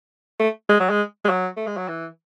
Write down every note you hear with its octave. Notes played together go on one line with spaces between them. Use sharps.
A3
G#3
F#3
G#3
G#3
F#3
A3
G#3
F#3
E3